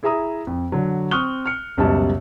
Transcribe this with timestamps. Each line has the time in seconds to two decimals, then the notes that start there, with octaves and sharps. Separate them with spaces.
0.03 E4 G#4 E5 A#5 D#6
0.47 F2
0.72 D3 F#3
1.11 C4 C#6 D#6 F6 F#6 G7
1.46 F6 C#7
1.77 C#2 F#2 B2 G3 D#5 A5